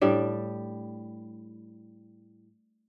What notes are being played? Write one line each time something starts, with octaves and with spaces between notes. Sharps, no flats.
A2 G3 D4